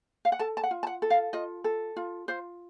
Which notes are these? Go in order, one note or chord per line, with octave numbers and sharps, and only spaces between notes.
F5
F#5
A4 A5
A5
F#5
F4
A5
F#5
A4
F5
F4 D#5
A4
F4
F4 C5